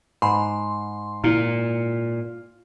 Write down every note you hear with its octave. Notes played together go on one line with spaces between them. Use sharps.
G#2 B5 C6
A#2 E4 F4